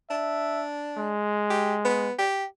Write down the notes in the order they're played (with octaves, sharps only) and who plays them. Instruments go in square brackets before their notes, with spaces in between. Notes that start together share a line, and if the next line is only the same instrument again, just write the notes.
[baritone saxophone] D4 [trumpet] E5
[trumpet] G#3
[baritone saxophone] G4
B3
G4